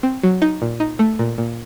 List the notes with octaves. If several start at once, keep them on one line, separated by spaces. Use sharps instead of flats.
C4
F#3
D#4
A#2
D#4
A3
A#2
A#2